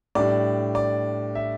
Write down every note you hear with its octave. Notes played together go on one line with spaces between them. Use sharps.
A2 G3 D4 D5
D5
E5